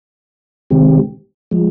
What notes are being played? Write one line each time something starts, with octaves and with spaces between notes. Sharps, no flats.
C3 D#3 G#3 C4 G4
F3 G#3